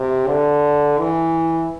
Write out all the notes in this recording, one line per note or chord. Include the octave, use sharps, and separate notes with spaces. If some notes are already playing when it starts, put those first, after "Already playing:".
Already playing: C3
D3
E3